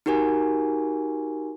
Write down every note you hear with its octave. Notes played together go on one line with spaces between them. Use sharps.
D#4 F#4 G4 A#4 G#5